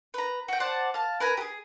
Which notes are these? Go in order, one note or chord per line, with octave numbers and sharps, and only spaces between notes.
B4 A#5
F#4 G5
C5 D5 F#5 A5
F5 A5
A#4 B4 G#5 A#5
G4 G#4